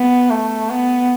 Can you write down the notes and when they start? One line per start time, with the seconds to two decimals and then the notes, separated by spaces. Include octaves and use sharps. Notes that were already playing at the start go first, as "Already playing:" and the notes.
Already playing: B3
0.30 A3
0.69 B3